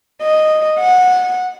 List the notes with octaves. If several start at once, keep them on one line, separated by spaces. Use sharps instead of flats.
D#5
F#5